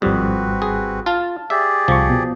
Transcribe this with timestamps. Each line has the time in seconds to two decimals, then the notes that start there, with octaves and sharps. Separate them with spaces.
0.02 G#1 F2 G3 C4 F#4 B4
0.62 G#4
1.06 F4 A5
1.50 G4 G#4 D5 E5
1.88 C2 F3 C#6
2.10 B2